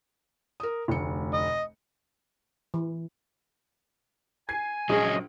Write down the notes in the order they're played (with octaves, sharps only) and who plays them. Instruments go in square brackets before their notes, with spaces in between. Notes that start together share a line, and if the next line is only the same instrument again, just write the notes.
[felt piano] A#4 D#6
F1 D2 C#7
[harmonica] D#5
[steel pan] E3
[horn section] G#5 [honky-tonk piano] G#6 C7
[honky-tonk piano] A#1 G#3 [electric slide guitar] F#3 C#4 G#4 [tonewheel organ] D#5